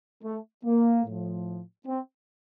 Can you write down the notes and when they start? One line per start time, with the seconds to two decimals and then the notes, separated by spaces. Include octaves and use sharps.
0.23 A3
0.65 A#3
1.05 A2 F3
1.87 C4